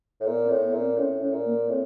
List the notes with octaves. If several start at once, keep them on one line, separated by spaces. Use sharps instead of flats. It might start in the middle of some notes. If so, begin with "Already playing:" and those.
A2
A#2 B3
C4
A2
B3
A#2
C4
A2 C#4
A2 C#4
A#2
A#3
A2 C4